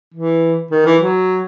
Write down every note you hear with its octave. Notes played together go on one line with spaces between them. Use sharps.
E3
D#3
E3
F#3